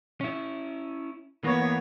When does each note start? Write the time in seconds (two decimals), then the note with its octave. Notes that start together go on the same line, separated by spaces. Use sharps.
0.21 C#4 E4
1.44 E3 A#3 B3 C#5